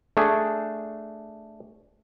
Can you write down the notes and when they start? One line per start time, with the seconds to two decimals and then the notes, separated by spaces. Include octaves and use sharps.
0.17 A3 D4 G#4 A4